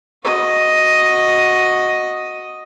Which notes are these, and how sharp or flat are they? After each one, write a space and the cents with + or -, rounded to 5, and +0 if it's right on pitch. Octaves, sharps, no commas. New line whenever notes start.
F#4 -10 D#5 +5